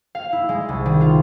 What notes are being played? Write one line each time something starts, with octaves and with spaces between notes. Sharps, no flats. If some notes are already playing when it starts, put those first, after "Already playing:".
F5
E4
G#3
C2
D#3
F4